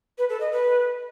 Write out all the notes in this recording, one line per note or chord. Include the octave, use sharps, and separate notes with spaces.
B4
A4
D#5
B4